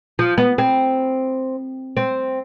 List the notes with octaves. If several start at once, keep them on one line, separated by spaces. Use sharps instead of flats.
F3
B3
C4
C4